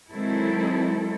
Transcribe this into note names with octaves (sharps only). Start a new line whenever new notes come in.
D#3 F#3 G#3 C4 E4 A4